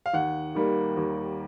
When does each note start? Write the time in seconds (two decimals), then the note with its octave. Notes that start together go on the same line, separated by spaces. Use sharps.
0.06 F5
0.13 D#2 F#5
0.55 D#3 G3 A#3
0.97 D#2